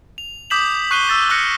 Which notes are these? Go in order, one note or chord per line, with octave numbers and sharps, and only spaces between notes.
F7
D6 D#6 G6 B6 E7 F#7
C#6 F#6 C7 D#7 F#7 G7
E6 A6 B6
D6 D#6 F6 F#6 A#6 C#7